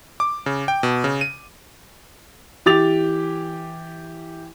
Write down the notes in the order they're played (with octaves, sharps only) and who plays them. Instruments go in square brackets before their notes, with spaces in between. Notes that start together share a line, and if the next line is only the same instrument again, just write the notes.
[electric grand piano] D6
C#3
G5
B2
C#3
D#7
[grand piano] E3 G4 D6 A6 F7